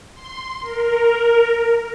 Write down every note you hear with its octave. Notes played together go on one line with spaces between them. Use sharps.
C6
A#4